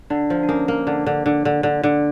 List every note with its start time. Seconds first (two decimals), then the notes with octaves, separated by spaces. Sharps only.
0.10 D3 D4
0.30 F3
0.43 D4
0.49 A#3 C#4
0.68 A#3
0.87 D3 D4
1.06 D3
1.26 D3
1.45 D3
1.63 D3
1.84 D3